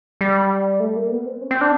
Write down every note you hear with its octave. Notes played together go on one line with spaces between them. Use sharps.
G3
A3
A#3
B3
C4
C#4
C4
D4